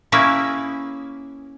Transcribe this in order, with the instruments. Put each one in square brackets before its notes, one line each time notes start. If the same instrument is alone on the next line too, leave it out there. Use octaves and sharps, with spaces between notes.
[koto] A#3 C#4 E4 G#4 B4